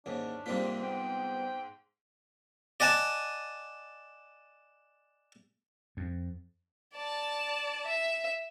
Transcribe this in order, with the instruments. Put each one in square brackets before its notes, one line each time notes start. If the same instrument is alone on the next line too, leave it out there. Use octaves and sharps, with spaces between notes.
[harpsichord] D#2 G#2 [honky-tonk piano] C#4 [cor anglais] D4
[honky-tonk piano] G#2 C4 B6 [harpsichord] C3 G3 F4 [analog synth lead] A#3
[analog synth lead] B3 [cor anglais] G5
[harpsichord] D5 D#5 F#5 G#5 A5
[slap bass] F2
[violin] D5 A5
E5